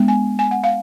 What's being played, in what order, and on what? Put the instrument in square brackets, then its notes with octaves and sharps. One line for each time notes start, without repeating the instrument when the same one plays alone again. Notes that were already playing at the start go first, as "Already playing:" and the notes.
Already playing: [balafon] G#3 B3 D4
G#5
G#5
F#5
F5